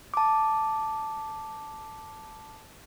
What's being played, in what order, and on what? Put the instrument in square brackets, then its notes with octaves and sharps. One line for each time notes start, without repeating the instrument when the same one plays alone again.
[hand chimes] A5 D6